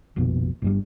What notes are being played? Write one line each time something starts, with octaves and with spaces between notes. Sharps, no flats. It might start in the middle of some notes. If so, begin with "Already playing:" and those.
F1 A#1 F2 B2
G1 G2 G3